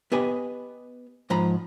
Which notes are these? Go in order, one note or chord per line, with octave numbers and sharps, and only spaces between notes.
B3 G4 B4 D#5 G#5
G#2 F3 A#5 B5